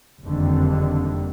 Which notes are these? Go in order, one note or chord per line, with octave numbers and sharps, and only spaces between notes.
F#1 F2 D3 D#3 G3